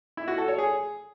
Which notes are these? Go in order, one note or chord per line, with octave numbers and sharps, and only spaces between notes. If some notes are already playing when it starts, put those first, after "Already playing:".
E4
F#4
A4
C#5
G#4